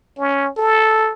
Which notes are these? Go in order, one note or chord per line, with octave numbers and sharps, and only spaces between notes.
C#4
A4